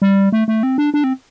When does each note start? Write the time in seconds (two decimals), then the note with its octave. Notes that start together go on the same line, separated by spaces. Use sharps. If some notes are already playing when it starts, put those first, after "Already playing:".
0.02 G3
0.32 A3
0.48 A3
0.63 C4
0.78 D4
0.94 D4
1.04 C4